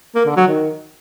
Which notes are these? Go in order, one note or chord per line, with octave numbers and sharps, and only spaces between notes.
A#3
D3
F#3
D#3